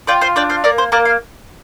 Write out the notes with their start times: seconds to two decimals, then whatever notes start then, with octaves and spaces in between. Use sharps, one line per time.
0.07 F4 D5 G5
0.21 C5 F5
0.36 D4 D5 G5
0.50 C5 F5
0.64 A#3 A#4 D5
0.78 C5
0.92 A#3 A#4 D5
1.05 F5